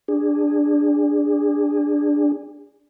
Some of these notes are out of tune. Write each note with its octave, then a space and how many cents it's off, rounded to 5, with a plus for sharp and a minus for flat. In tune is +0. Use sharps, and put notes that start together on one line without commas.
D4 +0 G#4 -25